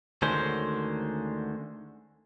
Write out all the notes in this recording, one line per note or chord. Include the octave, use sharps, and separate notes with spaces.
D2 D3 D#3 G#3 C#4 C5